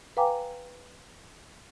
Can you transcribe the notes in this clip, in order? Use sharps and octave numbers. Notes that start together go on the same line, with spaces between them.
B4 F5 G5 G#5 A#5 D6